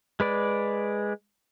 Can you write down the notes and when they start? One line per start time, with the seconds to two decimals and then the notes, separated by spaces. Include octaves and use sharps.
0.20 G#3 B4 D5